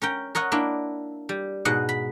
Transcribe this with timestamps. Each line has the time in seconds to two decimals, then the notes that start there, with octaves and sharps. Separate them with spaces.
0.02 C#4 A#4 G5
0.35 A#4 C#5 D#5 F#5
0.52 A#3 D4 E4
1.29 G3
1.65 G#2 B2 D#5 F#5
1.89 B5